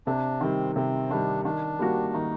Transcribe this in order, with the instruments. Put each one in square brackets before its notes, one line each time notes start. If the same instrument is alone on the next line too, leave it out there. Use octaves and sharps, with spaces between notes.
[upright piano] C3 [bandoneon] D4
[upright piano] D#3 G3 [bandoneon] C4
[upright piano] C3 [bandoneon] C4
[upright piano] D#3 G3 [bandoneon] D4
[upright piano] D#3 [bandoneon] D4
[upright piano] G3 A#3 F#4
[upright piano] D#3 [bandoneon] D#4